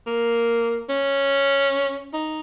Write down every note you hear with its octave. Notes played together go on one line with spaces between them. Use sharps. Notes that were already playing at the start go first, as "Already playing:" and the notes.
A#3
C#4
D#4